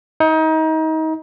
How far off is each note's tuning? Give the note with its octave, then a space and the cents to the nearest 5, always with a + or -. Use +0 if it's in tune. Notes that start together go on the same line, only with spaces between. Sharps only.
D#4 +30